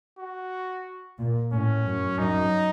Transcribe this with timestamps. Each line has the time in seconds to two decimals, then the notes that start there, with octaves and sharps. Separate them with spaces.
0.19 F#4
1.19 A#2
1.52 A2 C#4
1.85 F#2
2.18 F#2 D#4